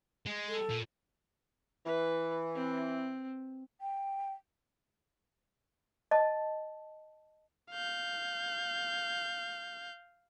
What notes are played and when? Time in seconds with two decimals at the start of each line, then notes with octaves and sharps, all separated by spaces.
0.26 G#3
0.48 A4
0.70 A#2
1.86 E3 B4
2.54 C4
3.81 G5
6.11 D#5 A5
7.72 F5 G6